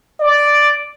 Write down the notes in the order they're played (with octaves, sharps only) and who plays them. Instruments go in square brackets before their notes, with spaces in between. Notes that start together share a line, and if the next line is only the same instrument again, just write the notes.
[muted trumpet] D5